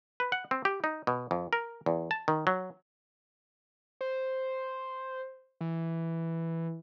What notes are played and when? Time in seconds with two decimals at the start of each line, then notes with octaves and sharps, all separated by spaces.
0.20 B4
0.32 F#5
0.51 C4
0.65 G4
0.84 D#4
1.07 B2
1.31 F2
1.53 A#4
1.86 E2
2.11 A5
2.28 D#3
2.47 F#3
4.01 C5
5.61 E3